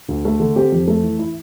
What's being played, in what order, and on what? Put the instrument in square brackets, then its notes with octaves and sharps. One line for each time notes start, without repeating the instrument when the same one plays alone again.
[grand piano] D2
A3
D3
C4 G4
F2
A3
E3
E4